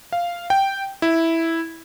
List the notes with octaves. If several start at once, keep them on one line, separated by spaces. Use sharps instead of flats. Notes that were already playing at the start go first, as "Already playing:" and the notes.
F5
G5
E4